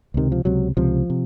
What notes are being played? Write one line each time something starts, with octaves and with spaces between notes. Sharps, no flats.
C#2 C3 D#3
F3
C#2 C3 F#3
C#2 C3 F3
C3